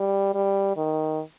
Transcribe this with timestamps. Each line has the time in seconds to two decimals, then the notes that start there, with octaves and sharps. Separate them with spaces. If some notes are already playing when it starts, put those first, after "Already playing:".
Already playing: G3
0.35 G3
0.77 D#3